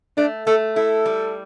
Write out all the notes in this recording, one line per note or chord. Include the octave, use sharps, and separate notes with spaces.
A3 D4
A3 A4
E4 A4
G3